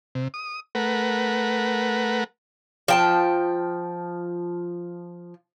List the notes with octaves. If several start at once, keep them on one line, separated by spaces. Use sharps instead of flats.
C3
D#6
A3 A#4 B4 F#5
F3 G5 A5